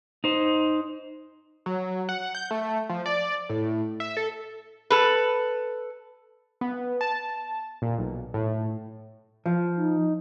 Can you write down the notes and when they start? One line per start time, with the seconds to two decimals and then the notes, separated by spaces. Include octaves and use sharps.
0.24 D#4 C5
1.66 F#3
2.09 F#5
2.35 G6
2.51 A3
2.89 F3
3.06 D5
3.49 A2
4.00 E5
4.17 A4
4.90 A4 B4
6.61 B3
7.01 A5
7.82 A#2
7.98 B1
8.34 A2
9.46 F3
9.77 D#4